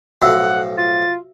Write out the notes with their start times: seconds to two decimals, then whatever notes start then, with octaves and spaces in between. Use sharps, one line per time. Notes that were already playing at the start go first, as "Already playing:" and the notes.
0.22 B1 A2 F3 F#4 E5 F#5 E6
0.77 F4 A6